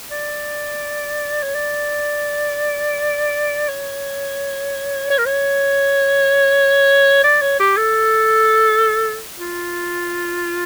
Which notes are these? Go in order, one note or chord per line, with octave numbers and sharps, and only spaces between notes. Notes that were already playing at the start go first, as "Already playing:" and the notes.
D5
C#5
D5
C#5
C#5
A#4
C#5
D5
C#5
G4
A4
F4